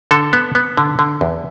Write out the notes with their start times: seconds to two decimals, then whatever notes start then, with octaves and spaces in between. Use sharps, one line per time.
0.11 D3 A4
0.33 B3
0.55 B3
0.77 D3
0.99 D3
1.21 E2